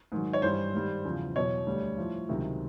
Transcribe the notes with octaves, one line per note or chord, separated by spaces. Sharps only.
G#2 D#3 F#3
C#5
G2 E3 G3 C5
G#2 D#3 G3
E2 C#3 F3
E2 B2 F#3 C#5
D2 D3 G3
A2 F3
C#2 C3 D#3 F#3